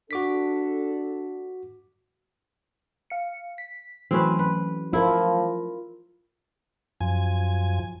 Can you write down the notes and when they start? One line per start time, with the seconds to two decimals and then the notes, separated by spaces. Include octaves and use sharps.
0.11 D4 F#4 A4 D6 B6
3.10 F5 C#7
3.58 B6
4.11 E3 F#3 A3 C4 C#4 B4
4.39 B4
4.93 F3 E4 F4 A#4
7.01 F#2 F3 G#5